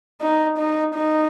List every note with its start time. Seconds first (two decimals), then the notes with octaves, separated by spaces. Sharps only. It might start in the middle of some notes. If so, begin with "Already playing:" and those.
0.21 D#4
0.58 D#4
0.95 D#4